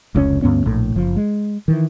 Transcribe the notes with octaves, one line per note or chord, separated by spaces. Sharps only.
F1 C#2 A2 C#4
D2 G2 B3 C#4
A#1 A2
F#1 F3
G#3
D#3 E3